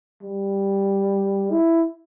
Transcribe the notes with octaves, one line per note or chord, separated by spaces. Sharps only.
G3
E4